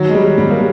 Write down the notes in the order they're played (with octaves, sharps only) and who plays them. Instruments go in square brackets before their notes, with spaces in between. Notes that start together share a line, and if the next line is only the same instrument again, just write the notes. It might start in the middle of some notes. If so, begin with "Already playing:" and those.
Already playing: [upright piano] D#3 [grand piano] F#3
[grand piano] G#3
G3
[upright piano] G#2 [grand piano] G3
[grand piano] A#3